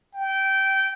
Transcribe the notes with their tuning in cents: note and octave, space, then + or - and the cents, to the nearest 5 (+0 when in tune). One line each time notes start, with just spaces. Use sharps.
G5 -20